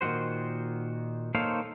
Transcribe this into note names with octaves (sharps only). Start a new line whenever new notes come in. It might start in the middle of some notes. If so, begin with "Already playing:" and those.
A#2 D#3 B3 F#4 C5
A#3 D#4 A4 C5 C#5 F5